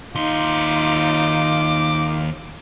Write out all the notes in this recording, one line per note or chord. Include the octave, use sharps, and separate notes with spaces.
D#2 D#4 F4 C6 D6